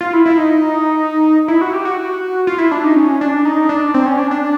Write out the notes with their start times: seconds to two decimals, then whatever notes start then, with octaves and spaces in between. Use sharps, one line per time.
0.01 F4
0.13 E4
0.26 E4
0.37 D#4
1.48 E4
1.61 F#4
1.73 G4
1.85 F#4
2.47 F4
2.58 E4
2.72 D4
2.83 D#4
2.95 C#4
3.21 D4
3.45 D#4
3.69 D4
3.94 C4
4.06 C#4
4.19 D4
4.31 D4